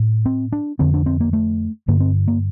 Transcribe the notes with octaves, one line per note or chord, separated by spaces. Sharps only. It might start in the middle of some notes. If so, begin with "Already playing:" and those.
Already playing: A2
C4
D4
F2 D3 C4
D4
C4
A#3
A3
G2 D3 A#3
C4
A#3